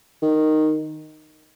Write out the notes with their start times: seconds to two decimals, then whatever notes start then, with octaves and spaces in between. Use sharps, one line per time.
0.22 D#3